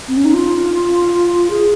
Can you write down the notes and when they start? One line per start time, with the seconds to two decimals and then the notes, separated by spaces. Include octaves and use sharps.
0.08 C4
0.17 C#4
0.25 D#4
0.34 F4
1.51 G#4